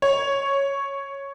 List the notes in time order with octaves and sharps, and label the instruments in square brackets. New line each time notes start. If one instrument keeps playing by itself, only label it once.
[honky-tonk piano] C#5